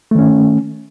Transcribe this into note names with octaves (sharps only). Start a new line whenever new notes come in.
D#3 A3 C#4